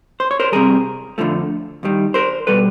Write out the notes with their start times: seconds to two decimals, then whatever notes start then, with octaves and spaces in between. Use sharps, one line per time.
0.20 C5
0.31 C#5
0.40 A#4 C5
0.52 C2 C3 E3 G3 G#4 A#4
1.18 F2 D3 F3 A3
1.83 D#2 D#3 G3
2.14 A#4 C5
2.47 B2 G3 A4 B4